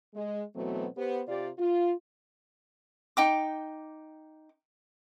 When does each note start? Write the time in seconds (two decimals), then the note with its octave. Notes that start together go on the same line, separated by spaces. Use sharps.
0.14 G#3
0.54 B2 E3 F#3 A3 B3 C4
0.96 B3 G4 C5
1.27 C3 F4 G4 D5
1.58 F4
3.17 D#4 G5 D6